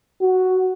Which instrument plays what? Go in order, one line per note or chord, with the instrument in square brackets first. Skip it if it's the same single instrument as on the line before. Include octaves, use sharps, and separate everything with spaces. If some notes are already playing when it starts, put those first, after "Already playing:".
[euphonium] F#4